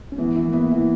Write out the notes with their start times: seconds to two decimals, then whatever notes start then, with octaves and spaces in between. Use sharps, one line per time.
0.12 C#4
0.18 E3 B3
0.36 E3
0.49 A#3
0.53 B3 E4
0.71 E3